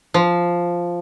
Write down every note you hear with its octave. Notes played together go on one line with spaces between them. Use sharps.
F3